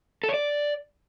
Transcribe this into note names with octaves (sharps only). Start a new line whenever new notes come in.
A4
C#5
D5